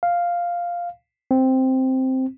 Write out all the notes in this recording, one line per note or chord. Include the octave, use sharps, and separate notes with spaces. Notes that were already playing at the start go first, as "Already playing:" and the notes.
F5
C4